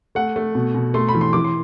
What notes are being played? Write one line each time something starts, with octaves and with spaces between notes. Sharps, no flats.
A3 F#5
A3
B2
B2
A3 C6
B5
E3
C6
E3 D6
C6